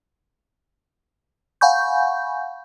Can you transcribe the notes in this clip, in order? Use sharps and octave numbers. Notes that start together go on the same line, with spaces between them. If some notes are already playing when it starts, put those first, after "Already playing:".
F5 F#5 G#5 B5 C#6 G6